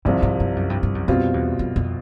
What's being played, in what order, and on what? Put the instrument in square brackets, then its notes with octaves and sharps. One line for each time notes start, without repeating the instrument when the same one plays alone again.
[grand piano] C2 C3 F3 [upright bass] G#2
[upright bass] G#2
G2
F#2
G2
G2
F#2
[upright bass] F2 [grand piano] B2 G3 C4 F4
[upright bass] E2
F2
F2